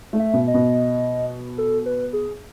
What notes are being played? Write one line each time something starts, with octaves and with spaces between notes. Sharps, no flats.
A3
E5
B2
D#5
B2
A4
B4
G#4